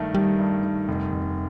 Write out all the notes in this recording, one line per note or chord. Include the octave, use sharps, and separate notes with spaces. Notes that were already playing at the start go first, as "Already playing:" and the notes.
Already playing: G2 D#3 A3
D#3 G3
G2
D#3
F1
F1